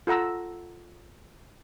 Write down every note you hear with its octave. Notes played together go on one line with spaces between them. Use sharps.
F4 A4 F#5 A#5 E6